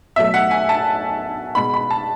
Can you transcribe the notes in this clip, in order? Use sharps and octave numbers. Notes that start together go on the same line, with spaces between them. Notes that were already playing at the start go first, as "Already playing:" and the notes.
B2 F#3 A3 E5
F#5
G#5
A5
B2 G#3 B5
B5
A5